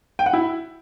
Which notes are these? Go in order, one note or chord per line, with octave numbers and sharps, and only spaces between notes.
G5
F#5
E4